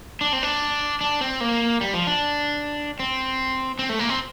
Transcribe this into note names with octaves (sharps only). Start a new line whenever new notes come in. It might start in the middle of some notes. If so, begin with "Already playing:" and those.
D4
C4
D4
D4
C4
A#3
G3
F3
D4
C4
C4
A3
A#3
C4